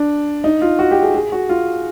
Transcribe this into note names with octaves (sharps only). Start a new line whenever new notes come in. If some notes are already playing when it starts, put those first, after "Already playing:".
Already playing: D4
D#4
F4
F#4
G4
G#4
G#4
F#4
F4